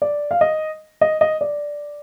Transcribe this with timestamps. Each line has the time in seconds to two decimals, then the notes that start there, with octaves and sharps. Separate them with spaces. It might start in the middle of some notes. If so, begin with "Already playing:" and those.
0.02 D5
0.31 F5
0.41 D#5
1.01 D#5
1.21 D#5
1.41 D5